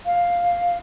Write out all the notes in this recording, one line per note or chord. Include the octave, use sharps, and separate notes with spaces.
F5